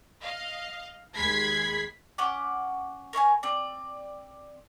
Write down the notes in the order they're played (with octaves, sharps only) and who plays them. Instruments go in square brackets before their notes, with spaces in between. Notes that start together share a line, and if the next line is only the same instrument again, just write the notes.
[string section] D#5 F5
D#2 G#3 B5 G#6 B6 C7
[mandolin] C#4 F#5 D6
A#4 C#5 E5 G#5
C4 D5